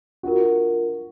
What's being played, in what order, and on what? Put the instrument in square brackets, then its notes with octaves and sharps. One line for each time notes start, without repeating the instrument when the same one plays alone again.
[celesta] D4 F4 A#4 [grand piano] F#4